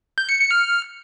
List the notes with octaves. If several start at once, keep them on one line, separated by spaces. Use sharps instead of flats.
G6
C#7
C#7
F6